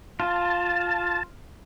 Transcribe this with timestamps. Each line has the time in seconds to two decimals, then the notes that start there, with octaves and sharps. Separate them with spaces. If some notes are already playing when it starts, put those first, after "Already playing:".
0.20 F4 A5